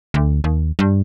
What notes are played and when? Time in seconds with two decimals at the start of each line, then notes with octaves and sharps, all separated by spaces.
0.14 D2
0.44 D#2
0.79 G2